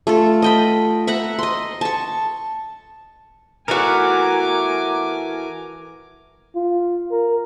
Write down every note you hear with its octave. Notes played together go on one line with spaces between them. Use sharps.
A3 F4 A4
D#5 G5 B5
E5 F#5 A#5 B5
D#5 C6
A5 C#6
E3 A3 F#4 A#4 G#5 D6
F4
A#4